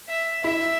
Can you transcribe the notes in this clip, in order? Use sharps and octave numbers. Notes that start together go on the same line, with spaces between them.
E5
E4 E5